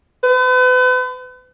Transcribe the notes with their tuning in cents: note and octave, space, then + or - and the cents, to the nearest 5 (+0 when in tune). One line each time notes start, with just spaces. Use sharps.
B4 +40